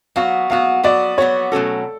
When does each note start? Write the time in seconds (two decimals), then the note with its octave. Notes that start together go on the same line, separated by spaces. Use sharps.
0.16 F#3 B3 F#4 F5
0.50 F#3 B3 F#4 F5
0.84 F#3 B3 F#4 D5
1.18 F#3 B3 F#4 C#5
1.52 B2 F#3 A3 C#4 F#4 A4